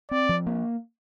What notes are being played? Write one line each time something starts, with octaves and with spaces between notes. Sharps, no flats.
C4 D5
F3
A#3